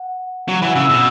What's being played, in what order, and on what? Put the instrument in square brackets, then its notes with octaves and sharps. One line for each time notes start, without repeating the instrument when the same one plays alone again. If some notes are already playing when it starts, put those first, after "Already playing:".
Already playing: [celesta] F#5
[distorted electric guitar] F#3
[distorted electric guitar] E3 [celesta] F#5 B5
[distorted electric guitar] C#3 [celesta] B5 E6
[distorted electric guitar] B2 [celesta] B5 E6